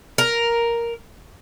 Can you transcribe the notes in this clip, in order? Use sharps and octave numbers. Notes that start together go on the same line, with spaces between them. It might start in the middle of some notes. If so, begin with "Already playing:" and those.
A#4